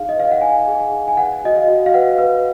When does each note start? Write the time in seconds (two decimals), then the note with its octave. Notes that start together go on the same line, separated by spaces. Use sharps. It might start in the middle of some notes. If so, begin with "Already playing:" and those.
Already playing: D#4 G#4 F5
0.09 D#5
0.16 B4 F5
0.31 F#5
0.41 D#4 G#5
0.68 G#4
0.92 D#4
1.08 G#5
1.17 B4 F#5
1.44 F#4 D#5
1.56 F5
1.68 F#4
1.86 F5
1.94 B4 F#5
2.18 B4